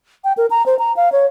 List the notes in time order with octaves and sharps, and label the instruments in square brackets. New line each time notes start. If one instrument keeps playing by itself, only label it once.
[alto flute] G5
A#4
A#5
C5
A#5
F5
C#5